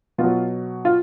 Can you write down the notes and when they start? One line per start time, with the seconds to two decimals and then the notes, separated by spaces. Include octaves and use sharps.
0.18 B2 F4
0.24 F#3
0.85 F4